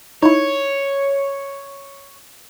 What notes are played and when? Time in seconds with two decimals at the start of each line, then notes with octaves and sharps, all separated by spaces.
0.23 D#4 E4 C#5